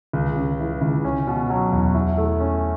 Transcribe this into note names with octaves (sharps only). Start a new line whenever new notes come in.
C#2
C#3
E3
C#2
C#4
B2
F#3
E2
E4
A3
C#4